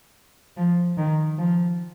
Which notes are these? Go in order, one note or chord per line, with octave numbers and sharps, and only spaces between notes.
F3
D#3
F3